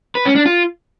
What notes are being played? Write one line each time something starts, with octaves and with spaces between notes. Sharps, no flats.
B4
C#4
D4
F4